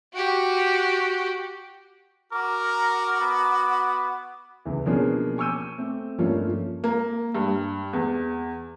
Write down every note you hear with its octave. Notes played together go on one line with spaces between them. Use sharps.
F#4 G4
F#4 A#4 D6
B3
C#2 E3
B2 F3 A#3 C#4 D4 G#4
G#5 C#6 D6 E6 G6 D#7
A3 C4
G2 F3 A3 A#3 C#4 F4
A#3
G2
E2